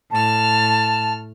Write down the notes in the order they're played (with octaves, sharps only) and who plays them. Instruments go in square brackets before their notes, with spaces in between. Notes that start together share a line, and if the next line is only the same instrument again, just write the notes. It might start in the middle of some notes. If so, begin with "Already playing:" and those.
[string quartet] A2 F6 [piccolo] A5